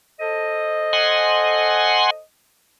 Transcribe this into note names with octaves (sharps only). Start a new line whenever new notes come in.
A4 C5 D#5
F#5 G#5 C6